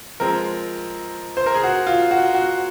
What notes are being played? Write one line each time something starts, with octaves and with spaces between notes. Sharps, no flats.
F3 G#3 C4 A#4
C5
A#4
G#4
F#4
F4
F#4
F#4